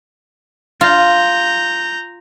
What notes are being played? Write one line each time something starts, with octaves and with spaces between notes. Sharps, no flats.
F4 A#5 G6